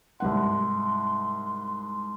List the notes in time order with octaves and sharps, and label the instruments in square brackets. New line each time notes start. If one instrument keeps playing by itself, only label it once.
[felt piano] C2 G#2 F#5 [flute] C6